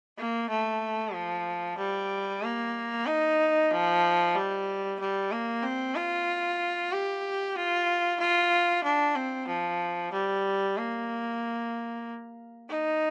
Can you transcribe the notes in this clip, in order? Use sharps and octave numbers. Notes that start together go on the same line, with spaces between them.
A#3
A3
F3
G3
A#3
D#4
F3
G3
G3
A#3
C4
F4
G4
F4
F4
D4
C4
F3
G3
A#3
D#4